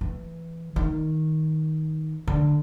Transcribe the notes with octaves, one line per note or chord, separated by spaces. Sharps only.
E3
D#3
D3